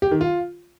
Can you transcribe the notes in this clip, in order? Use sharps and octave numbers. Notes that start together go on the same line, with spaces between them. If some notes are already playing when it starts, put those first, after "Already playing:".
G4
D#3
F4